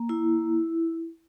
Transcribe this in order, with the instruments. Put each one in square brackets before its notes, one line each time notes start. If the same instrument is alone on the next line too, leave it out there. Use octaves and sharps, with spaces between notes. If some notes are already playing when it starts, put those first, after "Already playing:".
Already playing: [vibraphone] A#3
E4